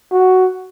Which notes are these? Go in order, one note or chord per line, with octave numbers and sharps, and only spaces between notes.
F#4